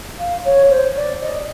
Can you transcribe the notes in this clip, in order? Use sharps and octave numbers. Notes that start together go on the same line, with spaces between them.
F5
C#5
C5
D5
D#5